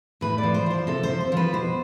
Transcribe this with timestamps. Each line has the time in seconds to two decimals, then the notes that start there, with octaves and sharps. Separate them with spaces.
0.21 A2 B4
0.38 D5
0.43 F3
0.54 C5
0.66 F3 C5
0.87 C3 A4
1.03 C5
1.09 F3
1.21 C5
1.32 F3 B4
1.53 B2 C5